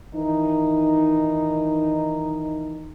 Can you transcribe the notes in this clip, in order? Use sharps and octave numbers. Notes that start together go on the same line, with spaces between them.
D#3 E3 D#4